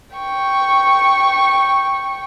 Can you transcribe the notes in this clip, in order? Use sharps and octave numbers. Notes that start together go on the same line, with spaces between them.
G5 C#6